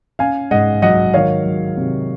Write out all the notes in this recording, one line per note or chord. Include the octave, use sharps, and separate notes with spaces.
C#4 F5 G#5
G#2 D#5 F#5
F#3 D#5 F#5
D#3 C#5 F5
F#3
C3